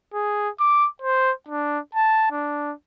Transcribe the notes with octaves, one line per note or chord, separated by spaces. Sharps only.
G#4
D6
C5
D4
A5
D4